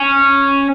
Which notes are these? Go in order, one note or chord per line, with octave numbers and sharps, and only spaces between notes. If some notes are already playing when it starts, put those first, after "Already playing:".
Already playing: C#4